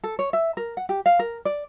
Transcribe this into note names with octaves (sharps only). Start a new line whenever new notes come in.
A4
C#5
E5
A#4
F#5
G4
F5
A#4
D5